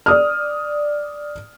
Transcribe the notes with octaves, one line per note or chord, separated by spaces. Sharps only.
D5 D#6 F6